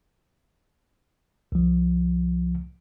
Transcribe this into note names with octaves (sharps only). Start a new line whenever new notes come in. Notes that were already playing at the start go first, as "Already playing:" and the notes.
C2 F3